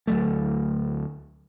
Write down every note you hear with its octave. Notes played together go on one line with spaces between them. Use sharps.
D2 F#3 A3